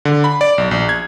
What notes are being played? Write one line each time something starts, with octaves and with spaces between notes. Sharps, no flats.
D3
B5
D5
B1
A#1
G#6